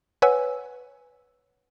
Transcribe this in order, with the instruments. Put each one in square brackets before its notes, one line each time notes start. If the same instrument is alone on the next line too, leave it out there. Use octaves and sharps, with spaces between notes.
[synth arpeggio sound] B4 C#5 F#5 G#5 E6